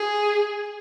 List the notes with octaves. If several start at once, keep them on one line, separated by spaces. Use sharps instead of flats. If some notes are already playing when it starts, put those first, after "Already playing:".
Already playing: G#4